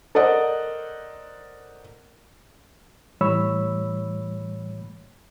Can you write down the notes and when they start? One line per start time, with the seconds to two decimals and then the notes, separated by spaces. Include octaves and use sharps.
0.15 A4 A#4 C5 D5 D#5 F#5
3.21 A2 E3 G3 C#5 B5 E6